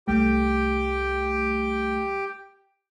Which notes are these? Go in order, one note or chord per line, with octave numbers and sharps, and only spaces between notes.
C2 G3 A3 G4 G5